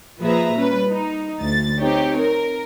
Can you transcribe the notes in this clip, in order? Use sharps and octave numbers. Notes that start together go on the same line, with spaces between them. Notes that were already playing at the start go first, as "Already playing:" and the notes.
A#2 F3 G#4 B4 E5 A#5
G3 C#4 B4
D#4
D2 A6
C4 D#4 G4 C#5
A#4